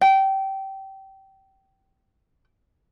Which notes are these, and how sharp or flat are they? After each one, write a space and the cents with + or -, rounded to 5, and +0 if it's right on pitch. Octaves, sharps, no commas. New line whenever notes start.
G5 -20